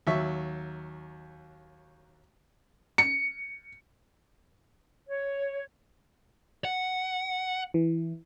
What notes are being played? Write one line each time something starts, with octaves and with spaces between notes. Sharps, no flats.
D#2 F#3 E5 C#6
C#7
C#5
F#5
E3